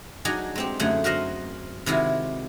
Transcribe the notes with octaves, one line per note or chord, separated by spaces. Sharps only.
F#3 D4 D#4 F#4 G#4
G#3 C4 G4
F#2 D3 A3 G#4 F#5
F#4 A#4 C5 D#5 F#5
C3 D#3 G#3 E4 F#4